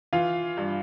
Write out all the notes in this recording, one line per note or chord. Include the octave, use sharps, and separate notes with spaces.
E3 F4 F5
G2